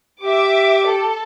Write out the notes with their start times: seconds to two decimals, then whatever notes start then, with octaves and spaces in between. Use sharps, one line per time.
0.21 G4 E5 D6
0.86 A4